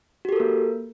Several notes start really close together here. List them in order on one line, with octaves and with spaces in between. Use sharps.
F#4 G4 A4 A#4 A#3